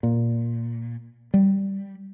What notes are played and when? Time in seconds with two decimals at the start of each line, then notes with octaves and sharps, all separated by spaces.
0.03 A#2
1.34 G3